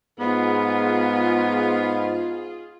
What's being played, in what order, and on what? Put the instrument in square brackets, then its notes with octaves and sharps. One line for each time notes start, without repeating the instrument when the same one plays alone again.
[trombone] G#2 [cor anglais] B3 [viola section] F4 G#4